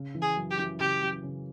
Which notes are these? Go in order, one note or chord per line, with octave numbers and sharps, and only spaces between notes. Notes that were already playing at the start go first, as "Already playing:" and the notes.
Already playing: C#3
E3
G#4
F#2
G4
E3
C#3 G4
F#2
C#3